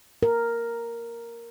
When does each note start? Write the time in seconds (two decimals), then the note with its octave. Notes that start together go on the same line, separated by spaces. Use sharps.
0.23 A#4